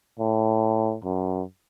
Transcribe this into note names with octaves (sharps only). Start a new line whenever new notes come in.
A2
F#2